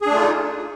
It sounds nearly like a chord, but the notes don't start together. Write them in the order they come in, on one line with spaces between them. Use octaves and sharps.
G#4 D4 A3 F4 D#4